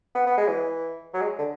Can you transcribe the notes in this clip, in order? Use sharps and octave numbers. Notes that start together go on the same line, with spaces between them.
B3
B3
G#3
E3
F#3
G#3
D3